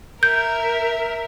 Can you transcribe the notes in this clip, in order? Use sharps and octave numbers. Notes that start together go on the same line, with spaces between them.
A#4 E5 G6